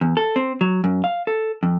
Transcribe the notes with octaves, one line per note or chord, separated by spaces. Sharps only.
E2
A4
C4
F#3
F#2
F5
A4
F2